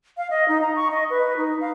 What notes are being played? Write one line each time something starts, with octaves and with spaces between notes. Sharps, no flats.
F5
D#5
D#4
A#5
C#6
D#5
B4
D#4
F5